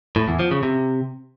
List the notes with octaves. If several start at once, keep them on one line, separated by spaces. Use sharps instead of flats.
A2
E2
F3
C#3
C3